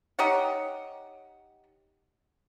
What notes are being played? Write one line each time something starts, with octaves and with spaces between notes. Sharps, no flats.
D#4 G4 C#5 F#5